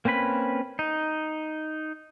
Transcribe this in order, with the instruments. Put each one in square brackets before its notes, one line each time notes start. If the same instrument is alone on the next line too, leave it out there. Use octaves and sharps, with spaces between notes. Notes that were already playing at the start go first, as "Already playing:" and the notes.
[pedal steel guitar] A#3 C4 C#4 B4 B5
D#4